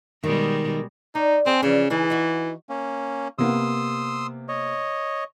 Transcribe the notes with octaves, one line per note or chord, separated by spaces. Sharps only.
B2 D#3 G3 G#3
D4 D#4
C4 G#4
C#3 E3 F3 D4
C#3 E3 D#4 G#4
D#4 F#4
A#3 C#4
C3 A#3 B3 C6 D#6 E6
C#5 D#5